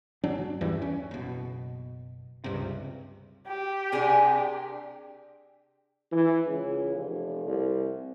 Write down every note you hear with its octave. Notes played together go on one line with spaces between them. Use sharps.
G1 F#3 C#4 D4
E2 G2 E3 G3
C#4
F#1 B2
C#2 G2 C3
G4
C3 D4 G#4 A#4 G#5
E3
C#2
F1
C2